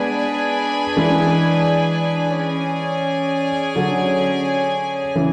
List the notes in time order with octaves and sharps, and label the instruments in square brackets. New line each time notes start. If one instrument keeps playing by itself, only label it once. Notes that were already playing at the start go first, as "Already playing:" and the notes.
Already playing: [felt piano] G#3 B3 [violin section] D4 G#4 B4 D5 G#5
[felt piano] E3 G#3
[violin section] C#4 G#4 D5 G#5
[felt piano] D3 F#3
C#3 E3